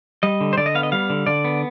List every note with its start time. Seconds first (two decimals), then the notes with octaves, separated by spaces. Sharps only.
0.23 G3 D#5
0.41 D3
0.53 C5
0.58 D3 D5
0.66 D#5
0.75 B3 F5
0.83 D#5
0.92 G3 F5
1.10 D3
1.27 D3 D5
1.45 B3